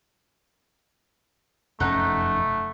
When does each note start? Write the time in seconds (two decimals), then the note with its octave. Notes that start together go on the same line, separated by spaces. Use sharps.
1.80 F1 F#2 A3 C#4 D#4 F#5